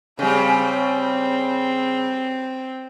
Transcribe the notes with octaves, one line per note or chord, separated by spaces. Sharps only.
C#3 G3 C4